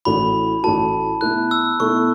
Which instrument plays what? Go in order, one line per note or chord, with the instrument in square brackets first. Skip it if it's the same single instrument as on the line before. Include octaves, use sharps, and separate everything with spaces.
[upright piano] A1 A2 A3 F#4 [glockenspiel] B5
[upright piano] A1 A2 A3 F#4 [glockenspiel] A5
[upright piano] B2 A3 E4 A4 [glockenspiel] F#6
[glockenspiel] E6
[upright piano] B2 A3 E4 A4 [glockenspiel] C#6